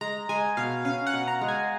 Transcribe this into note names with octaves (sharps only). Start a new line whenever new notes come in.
G#3 A#5
G#3 G#5
B2 F5
C#4 F5
F#5
B2
A#5
G#3
G#5